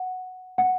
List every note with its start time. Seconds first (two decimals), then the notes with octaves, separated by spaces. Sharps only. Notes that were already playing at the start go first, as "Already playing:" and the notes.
Already playing: F#5
0.58 F#5